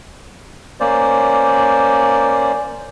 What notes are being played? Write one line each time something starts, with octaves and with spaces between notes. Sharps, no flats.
A#3 C#4 C5 D5